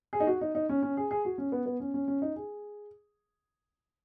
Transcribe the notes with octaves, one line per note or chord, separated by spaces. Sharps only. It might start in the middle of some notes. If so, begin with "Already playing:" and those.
G#4
D#4
F#4
D#4
D#4
C#4
C#4
G#4
G#4
F#4
C#4
B3
B3
C#4
C#4
C#4
D#4
G#4